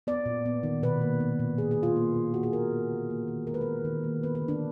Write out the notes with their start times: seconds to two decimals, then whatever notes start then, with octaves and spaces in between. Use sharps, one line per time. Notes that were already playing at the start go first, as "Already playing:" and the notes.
0.07 B3 D5
0.26 A#2
0.46 B3
0.63 D#3
0.83 B2 B4
1.01 A#3
1.20 B3
1.39 A#2
1.58 B3 G#4
1.71 G#4
1.78 A#2
1.83 F4
1.96 A#3
2.15 A#2
2.34 B3 F#4
2.43 G#4
2.52 A#2 A#4
2.71 B3
2.91 D3
3.10 A#3
3.28 D#3
3.47 G#3 A#4
3.54 B4
3.61 A#4
3.66 B3
3.85 D#3
4.04 A#3
4.23 B3 B4
4.35 B4
4.42 D3
4.48 D4